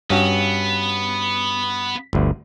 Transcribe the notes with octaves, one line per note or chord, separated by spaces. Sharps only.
G2 B3 C#4 F#4
G1 D2